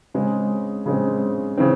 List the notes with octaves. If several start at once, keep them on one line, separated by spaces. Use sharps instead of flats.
C#3 G#3 C4
C#3 G#3 C4
C#3 E3 C4